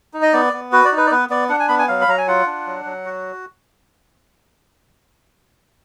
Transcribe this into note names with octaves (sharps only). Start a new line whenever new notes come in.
D#4
D#5
B3 D5
B3
F#4 B4
D5
D#4
B4
D5
B3 B4
B3 D5
D4 F#5
G#5
B3 B5
G#5
F#3 F5
B5
F#3 A#5
G#5
F4 F#5
D4
F#3
F#3
F#4